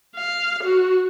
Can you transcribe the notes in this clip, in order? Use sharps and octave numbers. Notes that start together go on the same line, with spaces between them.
F5
F#4